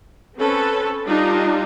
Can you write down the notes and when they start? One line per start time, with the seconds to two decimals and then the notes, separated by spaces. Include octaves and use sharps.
0.38 C4 C#4 A4 B4
1.06 G3 D4 D#4 F4 G4